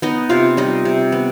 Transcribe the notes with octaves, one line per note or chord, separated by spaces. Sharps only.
B3 D#4 D#5
C3 F4 F5
G3 D#4 D#5
C3
B3